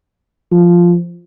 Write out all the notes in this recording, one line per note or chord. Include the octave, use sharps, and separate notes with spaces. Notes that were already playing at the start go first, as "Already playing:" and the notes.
F3